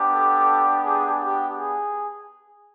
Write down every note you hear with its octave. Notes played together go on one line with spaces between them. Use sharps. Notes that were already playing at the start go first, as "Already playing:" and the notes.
Already playing: B3 D4 G4
A4
G#4
G4
G#4